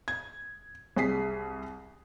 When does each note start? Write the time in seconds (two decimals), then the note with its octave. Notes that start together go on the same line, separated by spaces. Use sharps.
0.08 G#6
0.97 C2 G#4 B6 C7